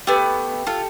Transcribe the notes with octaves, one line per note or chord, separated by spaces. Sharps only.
A3 B3 G4
F4 A4